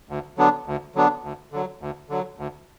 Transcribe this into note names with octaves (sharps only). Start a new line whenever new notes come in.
D2
D3 F#3 B3 D4
D2
D3 F#3 B3 D4
D2
D3 F#3
D2
D3 F#3
D2